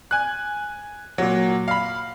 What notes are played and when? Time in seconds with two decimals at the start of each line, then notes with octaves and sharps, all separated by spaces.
0.11 G#5 F#6
1.18 A#2 F#3
1.68 F5 B5